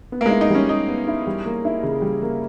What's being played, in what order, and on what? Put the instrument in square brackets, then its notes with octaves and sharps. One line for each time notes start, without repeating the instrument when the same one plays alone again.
[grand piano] B3
[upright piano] A#3
G#3
[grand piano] E4
[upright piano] D#4
[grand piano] G3 [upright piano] C#4
[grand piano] G3 [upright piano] D#4
[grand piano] B3
E4
G3
A#3
E4
C#3
G3
A#3